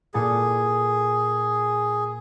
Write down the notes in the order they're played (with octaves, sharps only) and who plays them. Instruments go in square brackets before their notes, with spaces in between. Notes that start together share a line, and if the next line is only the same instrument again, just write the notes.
[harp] A#2 A4 A5 [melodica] G#4